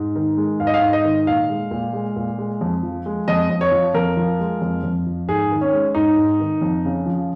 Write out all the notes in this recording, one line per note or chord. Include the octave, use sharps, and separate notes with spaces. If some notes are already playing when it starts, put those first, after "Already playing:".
Already playing: G#2
D#3
G#3
G#2 F5
D#5
F5
G#2
D#5
D#3
A#2 F5
G#3
A#2
G#3
A#2
G#3
F2
F3
G#3
F2 D#5
F2
C#5
F3
F2 A#4
F3
G#3
F2
F2
F3
G#2 G#4
D#3
C#4
G#3
G#2 D#4
G#2
D#3
F2
C#3
F3